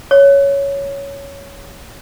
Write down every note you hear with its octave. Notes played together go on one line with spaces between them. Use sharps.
C#5